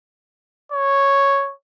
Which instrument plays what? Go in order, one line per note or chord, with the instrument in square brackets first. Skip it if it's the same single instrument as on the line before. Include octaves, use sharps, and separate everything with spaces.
[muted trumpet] C#5